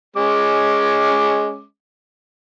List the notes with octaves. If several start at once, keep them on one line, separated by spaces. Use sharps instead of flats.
G#3 C#4 D6